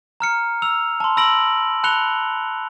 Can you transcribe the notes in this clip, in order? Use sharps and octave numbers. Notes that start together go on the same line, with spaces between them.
A#5 F6 C#7
E6 F7
A5 C6
B5 E6 A#6 D7 F#7
A5 B5 F#6 C#7 F7 G7